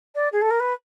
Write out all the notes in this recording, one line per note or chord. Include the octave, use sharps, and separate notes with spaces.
D5
G#4
A4
A#4
B4